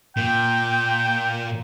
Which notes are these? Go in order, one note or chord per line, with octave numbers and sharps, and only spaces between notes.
A#2 G5